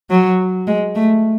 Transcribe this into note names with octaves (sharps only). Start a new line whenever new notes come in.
F#3
G#3
A3